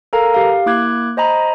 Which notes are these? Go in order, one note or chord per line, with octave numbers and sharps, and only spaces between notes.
A4 A#4 F5 G#5 A#5
G4 F5
A#3 E4 D6 F#6 G#6
C5 D#5 G#5 A#5 B5